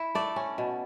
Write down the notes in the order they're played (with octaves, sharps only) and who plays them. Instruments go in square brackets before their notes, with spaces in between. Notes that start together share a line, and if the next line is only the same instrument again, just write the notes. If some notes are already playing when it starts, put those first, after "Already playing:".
Already playing: [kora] E4
A3 D5
C#4
B2